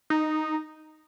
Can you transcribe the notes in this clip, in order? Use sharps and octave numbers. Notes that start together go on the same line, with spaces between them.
D#4